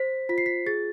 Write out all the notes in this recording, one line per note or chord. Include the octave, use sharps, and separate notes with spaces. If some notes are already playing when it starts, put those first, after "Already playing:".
Already playing: C5 B6
F4 B6
C7
B6
G#4 A6